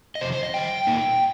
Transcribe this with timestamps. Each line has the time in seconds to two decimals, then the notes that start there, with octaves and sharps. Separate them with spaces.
0.15 D#5
0.21 F2 C3 F3 C5
0.32 C5
0.43 D#5
0.54 D#3 G3 G5
0.87 A#2 A#3 D#4